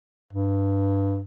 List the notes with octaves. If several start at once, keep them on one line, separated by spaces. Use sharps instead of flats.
G2